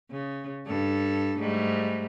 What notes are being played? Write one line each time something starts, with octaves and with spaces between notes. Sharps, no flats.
C#3
G2 A4
G#2 G3 A3